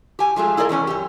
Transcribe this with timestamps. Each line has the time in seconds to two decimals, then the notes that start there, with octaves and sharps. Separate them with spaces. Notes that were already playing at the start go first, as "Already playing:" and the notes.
0.19 G4 G#5
0.36 F3 G#3 A3 F4
0.57 E4 G#4 A#4 D5 D#5
0.69 E2 C3 C#4 G#5
0.87 F#2 C3 G4